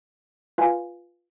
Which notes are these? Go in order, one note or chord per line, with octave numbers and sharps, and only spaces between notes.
F4 B4 F5 G#5